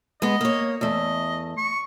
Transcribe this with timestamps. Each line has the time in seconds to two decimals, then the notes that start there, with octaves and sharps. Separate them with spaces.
0.22 G#3 B3 D#5
0.41 A#3 C#5
0.81 E2 A3 D#5
1.58 C#6